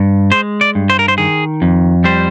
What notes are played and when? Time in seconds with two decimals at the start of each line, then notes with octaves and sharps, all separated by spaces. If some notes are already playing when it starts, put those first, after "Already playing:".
Already playing: G2
0.32 G#3 C5
0.61 D5
0.75 G2
0.90 C5
0.99 A#4
1.08 C5
1.18 D#3 G#4
1.62 F2
2.04 G3 C5